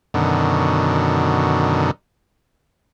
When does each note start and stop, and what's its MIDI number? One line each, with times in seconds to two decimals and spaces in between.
0.14 1.91 42
0.14 1.91 47
0.14 1.91 50
0.14 1.91 51